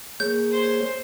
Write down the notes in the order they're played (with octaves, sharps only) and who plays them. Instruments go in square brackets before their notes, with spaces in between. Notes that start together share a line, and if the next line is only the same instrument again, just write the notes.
[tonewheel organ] A#3 G#4 C#5 [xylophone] G6
[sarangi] C5